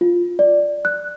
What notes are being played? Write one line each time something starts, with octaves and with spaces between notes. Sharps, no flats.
F4
D5
F#6